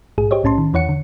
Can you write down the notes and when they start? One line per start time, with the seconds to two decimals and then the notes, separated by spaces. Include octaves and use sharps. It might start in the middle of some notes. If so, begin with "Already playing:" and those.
0.18 A#1 G#2 G#4
0.31 G4 C5 C#5 D#5
0.43 B1 A2 C#4 A5 C6
0.58 D#3
0.73 E2 E3 C#5 F#5 C#7
0.89 D3